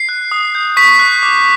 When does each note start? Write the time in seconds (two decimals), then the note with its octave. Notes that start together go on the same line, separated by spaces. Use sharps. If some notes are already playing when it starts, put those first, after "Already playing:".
Already playing: C7
0.09 F#6
0.32 D#6
0.55 G6
0.77 C#6 B6
0.99 F#6
1.23 D6